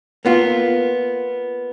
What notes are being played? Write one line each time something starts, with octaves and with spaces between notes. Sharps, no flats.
A#3 B3 F4